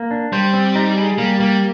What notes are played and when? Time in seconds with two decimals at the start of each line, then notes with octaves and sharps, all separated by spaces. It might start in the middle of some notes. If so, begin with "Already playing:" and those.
Already playing: A#3
0.11 D4
0.33 G3 C5
0.54 C4
0.75 D#4
0.96 G#4
1.18 G3 A#3
1.40 G3 A#3